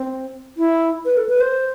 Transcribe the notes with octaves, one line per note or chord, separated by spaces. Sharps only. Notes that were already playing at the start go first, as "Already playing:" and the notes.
Already playing: C4
E4
B4
A4
B4
C5